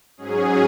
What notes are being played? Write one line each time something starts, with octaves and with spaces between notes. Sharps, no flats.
G#2 F#3 C#4 G#4